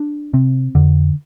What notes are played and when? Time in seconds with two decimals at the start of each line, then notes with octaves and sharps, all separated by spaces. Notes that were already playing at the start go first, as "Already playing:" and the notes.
Already playing: D4
0.33 C3 C4
0.75 F2 D3